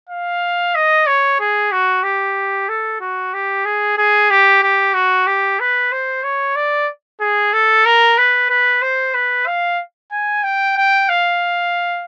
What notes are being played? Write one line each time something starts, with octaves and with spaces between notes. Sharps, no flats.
F5
D#5
C#5
G#4
F#4
G4
A4
F#4
G4
G#4
G#4
G4
G4
F#4
G4
B4
C5
C#5
D5
G#4
A4
A#4
B4
B4
C5
B4
F5
G#5
G5
G5
F5